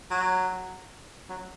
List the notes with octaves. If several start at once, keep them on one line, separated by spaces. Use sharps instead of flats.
F#3
F#3